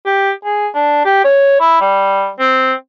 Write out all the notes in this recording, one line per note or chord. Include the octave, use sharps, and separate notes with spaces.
G4
G#4
D4
G4
C#5
E4
G3
C4